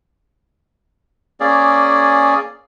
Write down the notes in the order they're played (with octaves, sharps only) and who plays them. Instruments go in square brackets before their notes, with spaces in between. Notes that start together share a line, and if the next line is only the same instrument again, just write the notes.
[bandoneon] A#3 C#4 G#4 D5